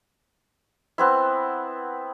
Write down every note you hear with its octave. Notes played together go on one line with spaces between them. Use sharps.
B3 C4 E4